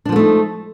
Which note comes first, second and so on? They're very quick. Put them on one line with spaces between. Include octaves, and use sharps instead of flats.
D4 F3 A#3 A3 D#4